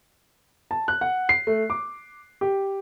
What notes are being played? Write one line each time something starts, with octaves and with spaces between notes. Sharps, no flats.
A5
F#6
F#5
C7
A3
D6
G4